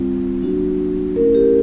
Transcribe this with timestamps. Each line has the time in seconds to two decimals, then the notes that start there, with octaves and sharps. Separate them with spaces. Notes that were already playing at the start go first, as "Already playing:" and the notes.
Already playing: G3 C4 F4
0.41 F#3 A#3 D4 F#4
1.16 A3 C#4 E4 A#4
1.35 G4